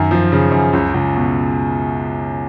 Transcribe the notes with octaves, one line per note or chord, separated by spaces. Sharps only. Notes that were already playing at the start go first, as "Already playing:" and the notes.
Already playing: F#2 D#3
F3
C#3
F#2
C#2
C#2
B2